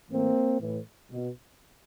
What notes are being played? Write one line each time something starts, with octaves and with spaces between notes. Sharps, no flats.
A2 E3 A#3 C4
A2 E3
B2